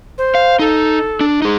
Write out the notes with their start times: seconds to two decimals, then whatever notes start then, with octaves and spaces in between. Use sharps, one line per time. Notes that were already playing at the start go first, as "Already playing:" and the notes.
0.17 C5
0.35 F5
0.59 D#4 A4
1.21 D4
1.42 D#4 G#4